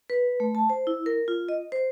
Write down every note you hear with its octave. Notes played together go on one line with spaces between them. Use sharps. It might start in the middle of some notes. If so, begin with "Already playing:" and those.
B4
A3
A5
C5
E4
A#4
F4
D#5
C5